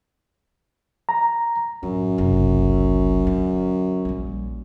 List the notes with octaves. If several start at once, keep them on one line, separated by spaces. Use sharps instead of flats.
A#5
A1 F#2
F#1 C2
D3
A#1 G3